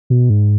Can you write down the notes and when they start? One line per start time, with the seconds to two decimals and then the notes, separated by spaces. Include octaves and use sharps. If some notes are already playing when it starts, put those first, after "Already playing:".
0.10 B2
0.30 G#2